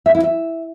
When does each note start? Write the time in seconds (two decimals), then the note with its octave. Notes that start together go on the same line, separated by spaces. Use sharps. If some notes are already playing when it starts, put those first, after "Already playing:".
0.06 E5
0.15 E4
0.24 E5